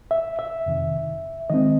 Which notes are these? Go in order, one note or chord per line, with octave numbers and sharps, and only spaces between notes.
E5
E5
F2 C3 D#3
D#3 G#3 C4 D#5